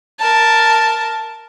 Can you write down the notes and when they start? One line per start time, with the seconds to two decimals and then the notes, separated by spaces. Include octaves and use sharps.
0.19 A#4 A5